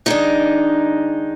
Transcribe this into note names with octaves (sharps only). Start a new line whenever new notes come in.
D#3 G#3 D4 D#4